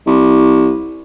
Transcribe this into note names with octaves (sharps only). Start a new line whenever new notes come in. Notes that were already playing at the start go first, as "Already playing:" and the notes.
C2